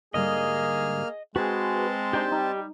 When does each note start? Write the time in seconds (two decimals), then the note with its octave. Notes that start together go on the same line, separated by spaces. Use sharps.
0.14 G#2 D3 G3 A#3 G#4 D#5 F6
1.36 G#3 C4 F#4 G#4 B4 A5
2.13 D4 D#4 G4 C5 G5
2.32 G3 D#4